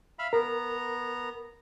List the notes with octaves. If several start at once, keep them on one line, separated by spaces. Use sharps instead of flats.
E5 F5 B5
B3 A#4 A#5